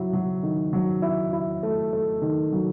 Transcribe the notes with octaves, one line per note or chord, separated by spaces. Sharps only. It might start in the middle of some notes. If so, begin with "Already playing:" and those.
Already playing: F#3 E4
F#3
D#3
F#3
E4
E4
A3
A3
D#3
F#3